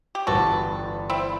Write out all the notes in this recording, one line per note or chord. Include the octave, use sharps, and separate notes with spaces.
G4
G1 G2 E3 G3 F#4 A4
C4 E4